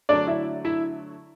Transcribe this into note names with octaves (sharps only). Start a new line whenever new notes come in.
D3 F#3 A3 D4 D5
E4 E5
E4 E5